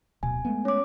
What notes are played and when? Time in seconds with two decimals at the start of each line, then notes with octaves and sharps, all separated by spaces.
0.23 D1 B2 G#5
0.45 G#3 A3 B3
0.65 C#4 C#5 D6